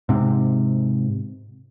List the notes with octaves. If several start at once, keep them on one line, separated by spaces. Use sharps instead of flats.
G#2 C3